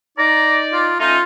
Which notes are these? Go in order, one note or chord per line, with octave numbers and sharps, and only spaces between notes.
D#4 D5 A#5
F4
A3 C#4 D#4 F4